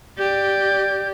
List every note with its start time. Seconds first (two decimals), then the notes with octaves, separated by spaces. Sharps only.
0.18 G4 D5 G6